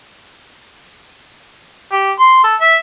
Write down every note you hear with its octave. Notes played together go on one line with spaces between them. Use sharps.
G4
C6
A4
E5